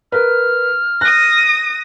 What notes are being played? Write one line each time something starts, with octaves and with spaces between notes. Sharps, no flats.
A#4 B4 F6
D#6 F#6 A#6